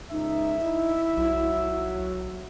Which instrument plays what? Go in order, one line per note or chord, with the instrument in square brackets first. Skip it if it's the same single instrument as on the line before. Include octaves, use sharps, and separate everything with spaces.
[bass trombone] C#2 [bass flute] D#4 [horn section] E5
[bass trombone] D#4 [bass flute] E4
[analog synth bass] B1 [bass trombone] F#3